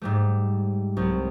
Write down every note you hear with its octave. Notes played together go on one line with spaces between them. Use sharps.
G#2 G3 A3
C2 F#3